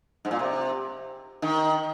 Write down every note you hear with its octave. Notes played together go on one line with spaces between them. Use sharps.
G#2
A#2
C3
D#3